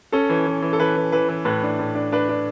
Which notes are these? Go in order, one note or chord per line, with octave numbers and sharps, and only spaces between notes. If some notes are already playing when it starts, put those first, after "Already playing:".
C#4 A4
E3
E3
E3
A4
E3 B4
E3
E3 B4
E3
A2 B4
D4
A2
D4
D4 B4
D4